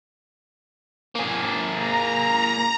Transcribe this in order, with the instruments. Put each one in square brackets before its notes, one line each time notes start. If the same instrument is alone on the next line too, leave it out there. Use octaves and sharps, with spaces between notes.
[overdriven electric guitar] A#3 G#4
[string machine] A#5